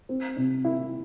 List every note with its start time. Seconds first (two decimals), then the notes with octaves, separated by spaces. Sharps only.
0.09 C4
0.37 C3
0.64 E4